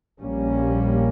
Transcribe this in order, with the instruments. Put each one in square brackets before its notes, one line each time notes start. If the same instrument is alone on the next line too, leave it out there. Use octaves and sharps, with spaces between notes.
[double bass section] A#1 A#2 G3 A#3 C#4